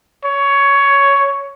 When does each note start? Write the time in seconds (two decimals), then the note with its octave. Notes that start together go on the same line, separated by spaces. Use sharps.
0.25 C#5